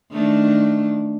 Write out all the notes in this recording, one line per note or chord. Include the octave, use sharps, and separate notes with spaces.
D#3 A3 D4